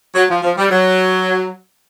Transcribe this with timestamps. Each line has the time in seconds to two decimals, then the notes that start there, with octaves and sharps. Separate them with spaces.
0.15 F#3
0.30 F3
0.43 F3
0.57 G3
0.70 F#3